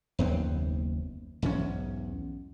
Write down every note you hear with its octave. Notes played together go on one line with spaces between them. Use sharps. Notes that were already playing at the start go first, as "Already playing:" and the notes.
F#1 D#2 B3 C4
B1 E2 G#2 C#4